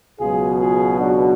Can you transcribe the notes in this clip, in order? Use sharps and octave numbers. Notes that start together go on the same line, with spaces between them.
C#2 B2 F#3 F4 G#4
F4 G#4
D4 F#4